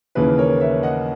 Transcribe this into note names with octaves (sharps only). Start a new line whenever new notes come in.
D#2 C#3 E3 A#3 B4
A#4 C#5
C#5 E5
D#5 F#5